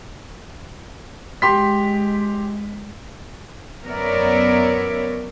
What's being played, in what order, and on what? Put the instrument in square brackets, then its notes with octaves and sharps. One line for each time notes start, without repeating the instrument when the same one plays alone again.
[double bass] G#3 [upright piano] G4 C6 B6
[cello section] F#2 B3 A#4 C#5 D5 E5